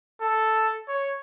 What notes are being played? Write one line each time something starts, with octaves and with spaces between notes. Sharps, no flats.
A4
C#5